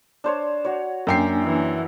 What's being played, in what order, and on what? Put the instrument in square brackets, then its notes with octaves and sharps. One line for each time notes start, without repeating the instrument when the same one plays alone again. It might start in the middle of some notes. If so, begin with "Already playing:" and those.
[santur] D4 C5 C#5
F#4 C#5
[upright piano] F#2 G5 C7 [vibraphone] A#3 D4 G#5
[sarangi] E3